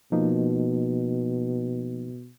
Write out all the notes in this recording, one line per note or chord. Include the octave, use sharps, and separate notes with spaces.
B2 F3 A#3 D#4